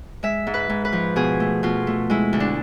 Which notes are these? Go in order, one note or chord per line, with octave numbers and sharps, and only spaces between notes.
G#3 E5
G#2
B4
G#2
B4
F3
B2 G#4
A3
B2 F4
A3
G#3 E4
D2
D4